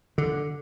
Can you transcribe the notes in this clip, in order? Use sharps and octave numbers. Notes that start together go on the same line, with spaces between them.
D3